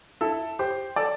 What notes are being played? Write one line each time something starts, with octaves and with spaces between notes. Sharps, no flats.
E4 A4
G4 C5
A4 D5